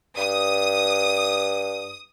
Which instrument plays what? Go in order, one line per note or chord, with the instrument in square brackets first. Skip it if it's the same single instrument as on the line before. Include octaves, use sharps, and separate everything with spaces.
[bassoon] G2 [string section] D#6